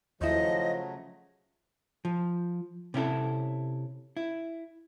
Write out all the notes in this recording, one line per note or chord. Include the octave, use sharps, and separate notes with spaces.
D#2 C#3 F3 F#3 A3 E4 D#5
F3
C3 C#4 E4 A4
E4